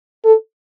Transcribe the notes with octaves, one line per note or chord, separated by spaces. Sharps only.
A4